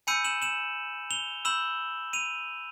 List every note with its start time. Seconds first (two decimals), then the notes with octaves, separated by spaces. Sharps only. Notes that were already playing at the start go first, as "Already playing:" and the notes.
0.07 G#5 B5 E6 G6 C#7 D#7
0.24 E7 F#7
0.42 E7 F#7
1.11 F7 G7
1.45 B5 E6 G6 E7 F#7
2.13 D#7 F7